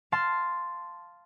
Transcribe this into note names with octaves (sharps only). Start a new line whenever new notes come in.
F5 A5 C6